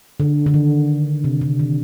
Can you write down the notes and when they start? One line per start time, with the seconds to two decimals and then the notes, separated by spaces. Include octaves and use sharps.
0.20 D3
0.46 D3
0.54 D#3
1.24 C3
1.41 D3
1.59 D#3